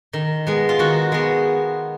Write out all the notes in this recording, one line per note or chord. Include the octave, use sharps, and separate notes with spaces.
D#3
G#3 B3
F4
D#3 F#4
G#3 B3